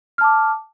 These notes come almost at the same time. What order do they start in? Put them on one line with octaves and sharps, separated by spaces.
F6 A5 D6